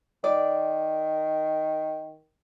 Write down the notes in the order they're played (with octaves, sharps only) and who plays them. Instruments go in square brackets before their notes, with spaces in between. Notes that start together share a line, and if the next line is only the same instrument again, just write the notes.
[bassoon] D#3 [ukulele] D5